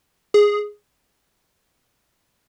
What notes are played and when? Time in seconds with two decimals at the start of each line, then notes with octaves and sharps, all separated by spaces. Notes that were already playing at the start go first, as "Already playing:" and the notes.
0.34 G#4